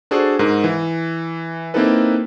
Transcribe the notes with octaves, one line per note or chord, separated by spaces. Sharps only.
D4 F#4 G#4 A4 C5
G#2 A#4
E3
A#3 C4 D#4 E4 A4 B4